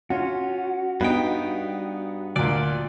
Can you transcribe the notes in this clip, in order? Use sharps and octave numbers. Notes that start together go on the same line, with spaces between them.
C#4 F4 F#4
G2 B3 D#4 G5
D2 A#2 D5